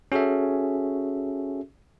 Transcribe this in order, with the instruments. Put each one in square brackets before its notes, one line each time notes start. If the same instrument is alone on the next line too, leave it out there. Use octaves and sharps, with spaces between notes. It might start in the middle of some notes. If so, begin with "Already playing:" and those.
[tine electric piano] C#4 F#4 G#4 A4 E5